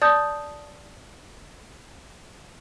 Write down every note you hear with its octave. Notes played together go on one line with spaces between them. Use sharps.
D5 A5 D#6 G6